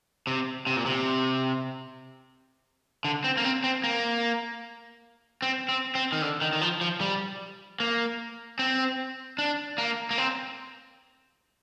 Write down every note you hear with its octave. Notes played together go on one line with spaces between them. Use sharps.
C3
C3
A#2
C3
D3
C4
A#3
C4
C4
A#3
C4
C4
C4
D#3
D3
D#3
D#3
F3
F3
G3
A#3
C4
D4
A#3
A#3
C4